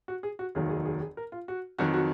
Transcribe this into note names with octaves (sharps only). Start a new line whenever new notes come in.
F#4
G#4
F#4
F1 D#2 D#3 F#3 G#4
G#4
G#4
G#4
A#4
F4
F#4
F2 D#3 F#3 F#4
F#4